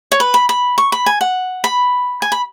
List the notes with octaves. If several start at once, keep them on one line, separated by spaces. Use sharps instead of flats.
C#5
B4
B5
B5
C#6
B5
G#5
F#5
B5
G#5
B5